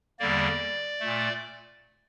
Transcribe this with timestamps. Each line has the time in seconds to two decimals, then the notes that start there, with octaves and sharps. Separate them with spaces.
0.20 E2 D3 G3 A#3 D5
1.00 A#2 A3